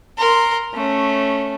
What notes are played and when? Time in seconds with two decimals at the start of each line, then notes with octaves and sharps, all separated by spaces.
0.18 A#4 C6
0.74 A3 C#4